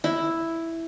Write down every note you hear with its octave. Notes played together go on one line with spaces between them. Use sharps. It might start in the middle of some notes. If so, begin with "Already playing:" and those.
E4